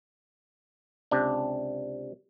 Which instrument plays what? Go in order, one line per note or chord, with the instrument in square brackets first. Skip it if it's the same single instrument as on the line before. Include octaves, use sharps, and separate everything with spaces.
[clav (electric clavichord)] C#2 C3 D4